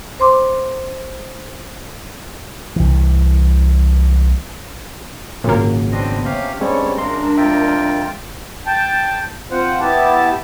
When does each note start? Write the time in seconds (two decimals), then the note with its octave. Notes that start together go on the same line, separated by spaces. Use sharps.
0.20 C5 C6 D6
2.76 C2 E3
5.44 G#1 A#2 C#3 F#3 A#3
5.92 B3 C4 D4 D#5
6.25 C3 C#4 G4 F5
6.61 G2 G3 G#3 C4 C#4 C#5
6.98 F#2 C#3 G#3 D4 A#4 C6
7.38 F2 F4 E5 G5
8.66 G5 A5
9.51 C4 F4 C5 F#5
9.80 B3 E4 G4 A5